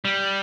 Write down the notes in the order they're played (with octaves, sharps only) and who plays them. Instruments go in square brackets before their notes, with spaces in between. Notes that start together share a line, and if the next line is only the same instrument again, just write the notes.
[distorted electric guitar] G3